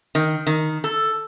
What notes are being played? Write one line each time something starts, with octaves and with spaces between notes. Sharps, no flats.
D#3
D#3
A4